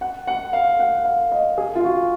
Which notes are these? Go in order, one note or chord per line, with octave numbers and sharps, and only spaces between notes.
F#5
F#5
F5
F#5
F5
D#5
G#4
F4
F#4